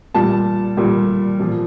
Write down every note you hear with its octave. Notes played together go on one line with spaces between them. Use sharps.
A#2 G3 A5
A#2 G3
A#2 F3